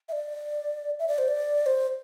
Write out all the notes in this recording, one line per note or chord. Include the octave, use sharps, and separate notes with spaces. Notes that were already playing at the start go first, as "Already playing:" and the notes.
E5
D5
E5
D5
C5
D5
C5